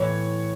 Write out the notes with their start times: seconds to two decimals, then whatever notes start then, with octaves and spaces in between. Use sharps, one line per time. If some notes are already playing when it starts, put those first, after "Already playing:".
Already playing: A2 E3 C#5